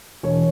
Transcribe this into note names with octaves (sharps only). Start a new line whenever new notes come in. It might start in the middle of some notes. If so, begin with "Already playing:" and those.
E1 C#5